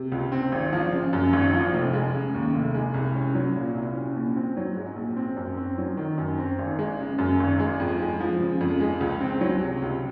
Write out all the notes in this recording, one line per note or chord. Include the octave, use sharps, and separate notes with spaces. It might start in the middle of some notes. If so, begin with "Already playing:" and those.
Already playing: C3
C#2
C4
G#1
F3
C#3
F#2
G#1
F3
F1
G#3
C#3
D#2
F1
G#3
C2
C#4
F#3
A#2
C2
C#4
A#1
C4
F#3
G#2
A#1
C4
F#2
C4
F#3
D#3
F#2
C4
G#1
G#3
C#3
F#2
G#1
G#3
F2
G#3
F3
C#3
F2
G#3
C#2
C4
F#3
C3
C#2